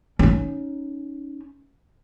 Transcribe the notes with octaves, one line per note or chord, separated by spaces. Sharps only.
C#4 D#4